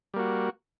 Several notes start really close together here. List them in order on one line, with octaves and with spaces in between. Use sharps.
G3 A#3 F#4